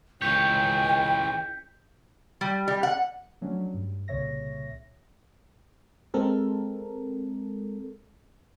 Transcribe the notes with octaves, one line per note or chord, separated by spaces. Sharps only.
C#2 E3 C#5 G5 G6 B6 C#7
G3
G3
F#5
F3 F#3 A3 C#4 D4
G2
C2 A#2 C#3 C#5 E5 A#6
G#3 C4 A4 A#4